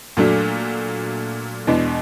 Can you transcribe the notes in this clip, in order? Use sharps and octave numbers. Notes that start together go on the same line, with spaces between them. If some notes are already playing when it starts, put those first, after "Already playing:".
A#2 F#3 A3 D4
E2 B2 G#3 B3 D4